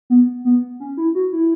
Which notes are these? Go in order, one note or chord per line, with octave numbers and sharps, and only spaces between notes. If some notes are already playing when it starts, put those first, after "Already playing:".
B3
B3
C#4
E4
F#4
E4